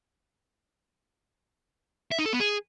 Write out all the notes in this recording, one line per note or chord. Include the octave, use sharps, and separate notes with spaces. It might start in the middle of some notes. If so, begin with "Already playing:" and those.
E5
D#4
A4
B3
G#4